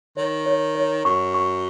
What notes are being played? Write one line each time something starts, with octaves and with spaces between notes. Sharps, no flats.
D#3 C#5
C#5
C#5
F#2 C#6
C#6